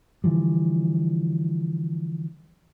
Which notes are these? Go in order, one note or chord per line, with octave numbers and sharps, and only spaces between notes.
D3 E3 F3 G3